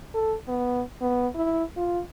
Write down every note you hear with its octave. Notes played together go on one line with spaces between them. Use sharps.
A4
B3
B3
E4
F4